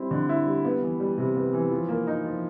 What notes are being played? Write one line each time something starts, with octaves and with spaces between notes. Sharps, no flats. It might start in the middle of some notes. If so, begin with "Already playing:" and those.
Already playing: G3 C4 E4
D3
E4
G3
B3
E3
G3
C3
B3
E3
F3
A#3
D#4
F3